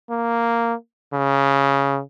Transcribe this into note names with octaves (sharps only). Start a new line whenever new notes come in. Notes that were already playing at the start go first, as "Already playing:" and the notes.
A#3
C#3